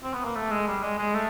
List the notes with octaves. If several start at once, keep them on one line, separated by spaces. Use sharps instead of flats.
C4
B3
A#3
A3
G#3
G3
G#3
G#3
A3